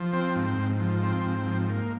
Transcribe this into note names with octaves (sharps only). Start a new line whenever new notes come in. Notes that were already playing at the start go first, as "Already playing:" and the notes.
Already playing: F3
C4
G#2
G#2
F3
C4
G#2
F3
A#3